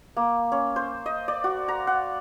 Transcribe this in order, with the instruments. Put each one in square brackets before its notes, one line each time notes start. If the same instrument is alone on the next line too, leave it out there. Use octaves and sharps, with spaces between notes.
[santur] A#3
C#4
C5
D#5
D5
F#4
A#5
F#5